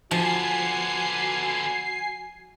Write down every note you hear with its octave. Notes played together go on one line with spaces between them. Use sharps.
D3 F3 B3 F#4 G#5 C7